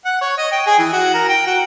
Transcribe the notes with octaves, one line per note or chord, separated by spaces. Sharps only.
F#5
C#5
D#5
G5
G#4
E3
F#4
A#4
G5
F#4